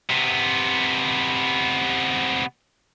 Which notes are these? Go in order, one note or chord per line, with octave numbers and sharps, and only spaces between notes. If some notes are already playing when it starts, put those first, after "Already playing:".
C3 B3